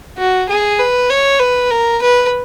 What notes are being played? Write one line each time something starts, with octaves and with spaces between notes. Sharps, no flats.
F#4
G#4
B4
C#5
B4
A#4
B4